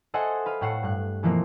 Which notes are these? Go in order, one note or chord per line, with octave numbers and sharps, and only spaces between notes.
A4 C5 D#5 E5 F#5 G#5
B4 F5
A2 A3 F#5 C7 E7
G2 F#6
B2 E3 F3 A#3 C4